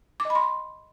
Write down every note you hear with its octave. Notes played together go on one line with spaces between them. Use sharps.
D6
D#5
B5
C6